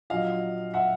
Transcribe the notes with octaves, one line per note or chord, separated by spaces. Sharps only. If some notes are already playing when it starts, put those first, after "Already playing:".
A#1 A#2 F#3 D#5 F5
E5 F#5